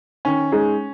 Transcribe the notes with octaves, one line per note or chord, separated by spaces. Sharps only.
D#3 C#4
G#3 D#4 G#4